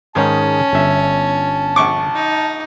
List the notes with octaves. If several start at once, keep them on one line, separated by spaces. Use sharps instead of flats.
G#2 D#3 C#4 G#4 A5
G1 E5
A#1 C#6 D6
D#4